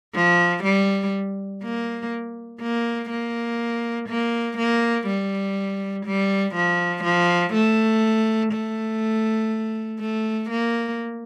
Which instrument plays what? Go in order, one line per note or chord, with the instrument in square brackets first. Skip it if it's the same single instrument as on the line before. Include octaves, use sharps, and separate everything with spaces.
[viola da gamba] F3
G3
A#3
A#3
A#3
A#3
A#3
G3
G3
F3
F3
A3
A3
A3
A#3